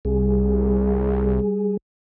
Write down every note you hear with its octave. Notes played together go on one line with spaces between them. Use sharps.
C2 G3 G#4